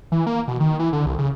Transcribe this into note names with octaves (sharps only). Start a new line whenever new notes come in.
E3
A#3
B2
D#3
E3
D3
C2
C#3